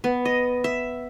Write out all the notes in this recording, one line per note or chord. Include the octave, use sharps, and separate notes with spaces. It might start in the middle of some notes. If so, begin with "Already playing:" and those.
B3
D#5
E5